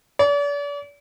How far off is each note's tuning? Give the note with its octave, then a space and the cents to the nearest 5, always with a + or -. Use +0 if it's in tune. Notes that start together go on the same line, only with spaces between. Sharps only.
D5 -40